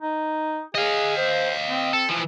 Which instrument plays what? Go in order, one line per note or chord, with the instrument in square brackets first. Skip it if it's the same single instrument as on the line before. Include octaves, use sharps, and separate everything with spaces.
[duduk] D#4
[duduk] G#4 [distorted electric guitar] D#5 F5
[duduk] C5
C4
[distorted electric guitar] A4
E3 F3